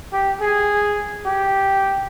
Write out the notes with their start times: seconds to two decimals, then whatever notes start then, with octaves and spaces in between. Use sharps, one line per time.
0.13 G4
0.41 G#4
1.26 G4